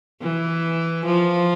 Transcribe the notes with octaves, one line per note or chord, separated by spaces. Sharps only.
E3
F3